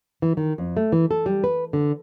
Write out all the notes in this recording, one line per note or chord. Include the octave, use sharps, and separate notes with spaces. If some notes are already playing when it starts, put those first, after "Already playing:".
E3
D#3
F2
A3
E3
A4
G3
B4
D3